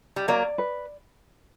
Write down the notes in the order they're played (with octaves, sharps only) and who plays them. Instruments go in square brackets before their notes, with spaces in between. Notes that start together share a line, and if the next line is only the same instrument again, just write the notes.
[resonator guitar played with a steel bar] G3
[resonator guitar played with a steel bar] F#3 A#3 [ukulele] D5
[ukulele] B4